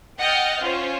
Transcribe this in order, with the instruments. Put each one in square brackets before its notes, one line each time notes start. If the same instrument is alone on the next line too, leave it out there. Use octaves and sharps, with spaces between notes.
[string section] D#5 F#5 G5 F6 G6 A6
C#4 F4 C5